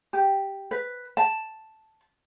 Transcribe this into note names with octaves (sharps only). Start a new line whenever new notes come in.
G4
B4
A5